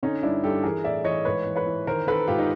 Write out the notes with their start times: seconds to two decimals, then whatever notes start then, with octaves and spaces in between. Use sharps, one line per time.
0.03 D3 C#4 D#4
0.23 G2 D4 E4
0.44 G2 G4 A4
0.64 E3 G#4 A#4
0.84 A2 D5 E5
1.04 E3 C#5 D#5
1.25 G#2 B4 C#5
1.46 E3
1.56 B4 C#5
1.66 E3
1.87 D#3 A#4 C5
2.07 D#3 A4 B4
2.27 G#2 F4 G4
2.38 D#4